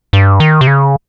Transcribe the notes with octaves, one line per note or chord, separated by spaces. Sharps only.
G2
D#3
C3
C#3